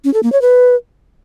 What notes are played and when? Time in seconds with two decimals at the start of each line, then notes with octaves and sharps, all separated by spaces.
0.04 C#4
0.14 A4
0.23 A#3
0.32 C#5
0.42 B4